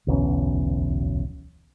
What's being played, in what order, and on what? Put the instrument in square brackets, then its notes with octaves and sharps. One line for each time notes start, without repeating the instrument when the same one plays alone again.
[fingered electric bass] D1 B1 E2 C#4